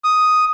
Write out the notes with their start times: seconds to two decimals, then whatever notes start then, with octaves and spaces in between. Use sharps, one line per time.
0.04 D#6